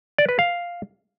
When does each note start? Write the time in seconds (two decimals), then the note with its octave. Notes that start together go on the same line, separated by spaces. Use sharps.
0.18 D5
0.29 B4
0.39 F5